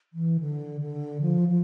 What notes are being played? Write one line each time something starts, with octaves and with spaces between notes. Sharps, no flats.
E3
D3
D3
F3
F3